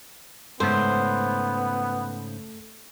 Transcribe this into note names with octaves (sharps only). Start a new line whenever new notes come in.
G#2 C#3 A3 B3 A4 C5